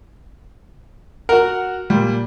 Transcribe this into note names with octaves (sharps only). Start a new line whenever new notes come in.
F#4 A#4 F#5
A#2 G3